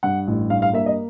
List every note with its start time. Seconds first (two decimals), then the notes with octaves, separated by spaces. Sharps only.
0.03 G2 F#5
0.27 A1
0.50 G2 F5
0.62 F5
0.73 A#3 E5
0.86 D#5